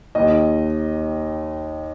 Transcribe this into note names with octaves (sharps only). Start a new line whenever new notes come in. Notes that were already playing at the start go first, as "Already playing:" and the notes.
D#2 D#3 D#5